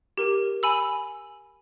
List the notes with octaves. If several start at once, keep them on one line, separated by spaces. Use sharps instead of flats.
G4 A#4
G#5 B5 E6